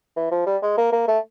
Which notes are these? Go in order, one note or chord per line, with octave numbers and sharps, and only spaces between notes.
E3
F3
G3
G#3
A#3
A#3
A3